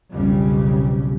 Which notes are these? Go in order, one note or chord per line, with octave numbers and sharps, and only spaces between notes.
B1 F2 C#3 G3